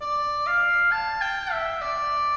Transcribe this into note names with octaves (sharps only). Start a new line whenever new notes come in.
D5
F5
A5
G5
E5
D5